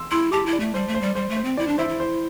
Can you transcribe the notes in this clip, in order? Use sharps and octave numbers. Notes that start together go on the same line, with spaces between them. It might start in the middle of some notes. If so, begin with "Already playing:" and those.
Already playing: C6 E6
E4 C6 E6
G4 A5 D6
E4
D5
A3
G3 C5
A3
C5
G3
G3 C5
A3
C5
C4
E4 D5
D4
E4 C5 E5
E4
C5